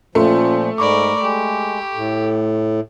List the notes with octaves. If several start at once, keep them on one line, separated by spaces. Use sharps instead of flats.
A#2 F3 A3 C#4 F4 C6
G#2 A#4 D5 B5 C#6 D6
G#3 G4
A2